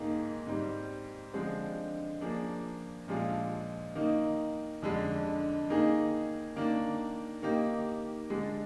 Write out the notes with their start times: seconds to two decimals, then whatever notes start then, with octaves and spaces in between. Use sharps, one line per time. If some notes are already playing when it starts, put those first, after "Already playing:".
Already playing: G#2 D#3 A#3 D#4 G#4
0.47 G#2 G3 C4
1.34 D3 F3 G#3 C4
2.21 F3 A#3 D4 G#4
3.08 A#2 F3 G#3 D4 F4
3.95 D#3 A#3 D#4
4.82 F2 D3 G#3
5.69 D#3 A#3 D#4 G#4
6.56 D#3 A#3 D4
7.42 D#3 A#3 D#4 G4
8.30 D3 G#3 D4